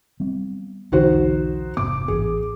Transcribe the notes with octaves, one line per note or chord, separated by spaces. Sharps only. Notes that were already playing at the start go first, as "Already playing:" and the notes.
G3 B3 C4
B1 E2 D3 D#4 F#4 C5
F1 G#2 B3 D6
A1 G#4